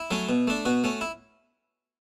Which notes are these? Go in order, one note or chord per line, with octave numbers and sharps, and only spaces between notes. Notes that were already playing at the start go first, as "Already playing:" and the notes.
Already playing: E4
F#3 A3 C#4
B2
A3 D4
B2 F#4
A3 C#4
E4